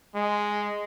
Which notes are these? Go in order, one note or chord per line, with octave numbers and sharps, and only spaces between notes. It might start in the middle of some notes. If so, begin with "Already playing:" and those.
G#3